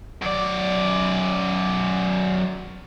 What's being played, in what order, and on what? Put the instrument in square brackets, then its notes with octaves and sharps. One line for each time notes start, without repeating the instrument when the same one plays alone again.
[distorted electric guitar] F#2 D5